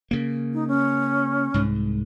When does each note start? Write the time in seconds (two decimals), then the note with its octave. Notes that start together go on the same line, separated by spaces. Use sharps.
0.11 C#3 A#3
0.54 D#4
0.68 C#4
1.54 C2 G#2